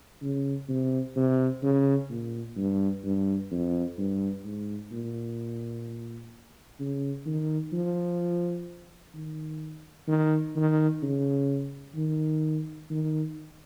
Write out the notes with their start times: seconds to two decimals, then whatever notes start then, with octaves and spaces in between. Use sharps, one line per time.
0.22 C#3
0.69 C3
1.16 C3
1.63 C#3
2.10 A#2
2.56 G2
3.04 G2
3.51 F2
3.98 G2
4.45 G#2
4.92 A#2
6.80 C#3
7.26 D#3
7.73 F3
9.14 D#3
10.08 D#3
10.56 D#3
11.02 C#3
11.96 D#3
12.90 D#3